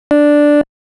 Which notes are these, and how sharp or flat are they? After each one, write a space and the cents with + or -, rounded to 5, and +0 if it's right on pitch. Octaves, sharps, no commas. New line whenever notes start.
D4 +0 D5 +0